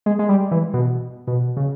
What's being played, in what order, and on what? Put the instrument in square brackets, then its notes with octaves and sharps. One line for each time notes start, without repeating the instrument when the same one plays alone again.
[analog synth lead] G#3
G#3
G3
E3
B2
B2
C#3